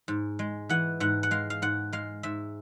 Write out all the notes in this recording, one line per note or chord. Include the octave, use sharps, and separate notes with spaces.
G#2
G#3
E3 F#5
G#2 F#5
F#5
G#3 F5
F5
G#2 F#5
G#3 F5
G#2 E5